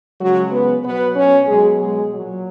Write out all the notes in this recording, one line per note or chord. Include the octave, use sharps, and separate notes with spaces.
C#3 F#3 G#3 F#4
B3 B4
B2 F#3 B3 B4
C#4 C#5
B2 F#3 G#3 G#4
G#3 G#4
A#2 F#3